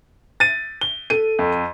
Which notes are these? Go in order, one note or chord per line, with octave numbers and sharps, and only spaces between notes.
A6 D#7
G7
A4 D#7
F2